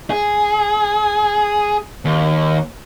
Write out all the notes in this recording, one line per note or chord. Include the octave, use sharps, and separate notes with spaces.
G#4
D#2